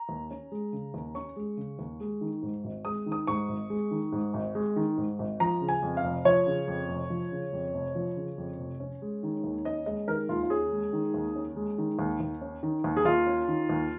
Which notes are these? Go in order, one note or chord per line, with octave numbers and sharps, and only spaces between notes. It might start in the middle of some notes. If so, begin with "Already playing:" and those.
Already playing: A#5
D#2
C#4
G#3
C#3
D#2
C#4 C#6
G#3
C#3
D#2
G#3
D#3
G#2
G#1
G#3 D#6
D#3
D#6
G#2 C#6
G#1
G#3
D#3
G#2
G#1
G#3
D#3
G#2
G#1
F3 A#5
C#3
G#5
F2
F5
F1
F3 C#5
C#3
F2
F1
F3
C#3
F2
F1
F3
C#3
F2
F1
C#4
G#3
D#3
D#2
C#4 D#5
G#3 D#5
D#3 A#4
D#2 F4
F4
C#4 G#4
G#3
D#3
D#2
C#4
G#3
D#3
D#2
D#2
C#4
D#3
D#2
G#4
D#2 F4
C#4
D#3
D#2